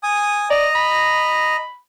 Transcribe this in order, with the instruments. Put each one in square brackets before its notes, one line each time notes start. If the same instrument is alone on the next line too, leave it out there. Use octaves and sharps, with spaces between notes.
[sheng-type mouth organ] G#5 D#6
[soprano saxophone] D5 [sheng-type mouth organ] D#5 A#5
[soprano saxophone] B5